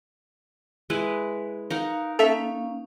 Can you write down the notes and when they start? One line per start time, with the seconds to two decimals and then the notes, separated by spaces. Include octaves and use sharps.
0.90 G#3 E4 B4
1.70 D#4 A#4 F5 F#5
2.19 A#3 C#4 A4 E5 F5